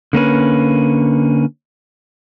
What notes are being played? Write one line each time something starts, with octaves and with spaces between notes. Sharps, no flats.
D3 A#3 C#4 B4